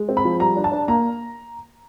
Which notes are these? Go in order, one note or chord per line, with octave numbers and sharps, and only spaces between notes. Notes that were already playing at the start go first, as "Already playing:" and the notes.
Already playing: G#3
C4
B5
F3
G3 A#5
D4
A5
D4
A#3 A#5